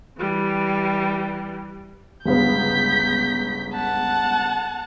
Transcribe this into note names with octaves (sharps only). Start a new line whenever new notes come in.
E3 G3
G1 C#2 B3 G6 B6
F#5 A5